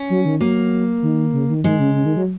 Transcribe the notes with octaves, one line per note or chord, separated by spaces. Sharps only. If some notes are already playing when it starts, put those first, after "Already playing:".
Already playing: C#4
F#3
D#3
F#3 A#3
D#3
C#3
D#3
D#3 G#3
C#3
C#3
D#3
F#3